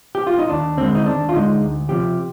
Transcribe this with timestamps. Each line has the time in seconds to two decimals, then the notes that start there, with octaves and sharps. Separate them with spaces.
0.15 G4
0.27 F4
0.39 D#4
0.49 D#2 D4
0.77 D3 G#3 C4
0.95 D#4
1.06 D#2 D4
1.29 F4
1.33 D3 G#3 D#4
1.61 D2
1.89 C3 F3 G4